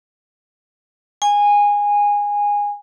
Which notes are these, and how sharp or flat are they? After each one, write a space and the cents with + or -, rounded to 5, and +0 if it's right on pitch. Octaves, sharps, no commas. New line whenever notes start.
G#5 -15